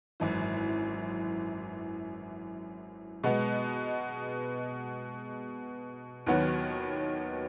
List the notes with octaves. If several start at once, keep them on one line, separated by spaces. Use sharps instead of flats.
G#1 F#2 E3
B2 G#3 B3
D#2 D#3 F#3 B3 F#4